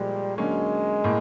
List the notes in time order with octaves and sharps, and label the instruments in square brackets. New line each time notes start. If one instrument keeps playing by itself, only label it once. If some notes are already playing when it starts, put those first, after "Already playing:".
Already playing: [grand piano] A#2 F3 G#3 [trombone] G3
[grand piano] D3 F#3 A#3 C#4 [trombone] G#3
[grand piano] A2 A#3